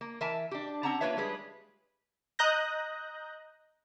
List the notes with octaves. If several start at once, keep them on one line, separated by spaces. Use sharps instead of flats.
A#3
E3 A#4 E5 G#5 A5
D4 G4
C4 C#4 F#5 A5 A#5
A#3 D4 F4 B4 C#5 E5
G3 G#3 G#4 B4
D#5 A#5 D#6 F#6 G6 A#6